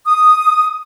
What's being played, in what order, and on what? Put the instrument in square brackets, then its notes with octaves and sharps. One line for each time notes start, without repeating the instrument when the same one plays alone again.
[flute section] D#6